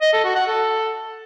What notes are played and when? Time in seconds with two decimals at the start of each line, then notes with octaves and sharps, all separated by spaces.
0.02 D#5
0.13 A4
0.24 F#4
0.35 F#5
0.46 A4